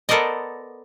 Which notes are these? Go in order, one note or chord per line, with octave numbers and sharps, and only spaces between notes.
B3 A4 A#4 C5 D5 D#5